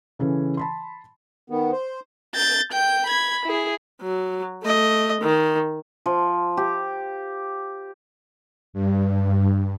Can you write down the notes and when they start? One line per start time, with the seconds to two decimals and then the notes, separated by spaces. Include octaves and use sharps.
0.19 C#3 E3 C#4 A4
0.57 A5 B5 C6
1.50 D#3 B3
1.72 C5
2.35 G6 A6
2.73 G5 G6
3.07 B5 G#6
3.46 E4 G#4
4.02 F#3
4.63 A3 D#5
5.21 D#3
6.06 F3
6.57 G4
8.73 G2